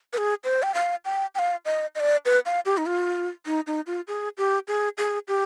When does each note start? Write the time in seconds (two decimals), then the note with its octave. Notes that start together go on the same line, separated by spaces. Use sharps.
0.13 B4
0.18 G#4
0.44 C5
0.63 G5
0.74 F5
1.05 G5
1.35 G5
1.39 F5
1.65 D#5
1.95 D#5
2.00 D5
2.26 B4
2.46 F5
2.66 G4
2.78 D#4
2.86 F4
3.46 D#4
3.67 D#4
3.87 F4
4.08 G#4
4.38 G4
4.68 G#4
4.98 G#4
5.28 G4